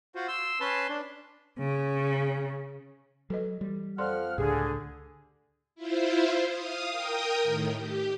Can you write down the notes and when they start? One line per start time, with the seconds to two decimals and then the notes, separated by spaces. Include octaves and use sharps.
0.15 F4 F#4 C5
0.28 C6 E6
0.60 C#4 B4 A5 C6
0.89 D4
1.58 C#3
3.30 F#3 A4 B4 D#5
3.61 E3 G3
3.98 F2 F3 A4 D5 F#5 C6 F6
4.38 C#2 A2 D3 G4 G#4
5.75 E4 F4 C5
6.44 F5 D#6
6.89 A#4 G5 D#6
7.42 A2 D#3
7.76 G4